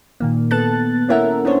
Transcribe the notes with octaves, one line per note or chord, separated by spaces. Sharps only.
A#2 D#3 A#3
B3 A4 F#6 A6
A#3 C#4 E4 A#4 E5 F#5
B3 C#4 D4 C5 C#5